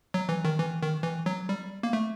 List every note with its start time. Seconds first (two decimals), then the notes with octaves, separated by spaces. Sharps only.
0.14 F#3
0.29 E3
0.45 D#3
0.59 E3
0.82 D#3
1.03 E3
1.26 F#3
1.49 G3
1.83 A#3
1.93 A3